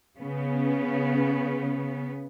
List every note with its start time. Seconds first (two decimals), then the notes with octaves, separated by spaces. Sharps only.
0.19 C#3 B3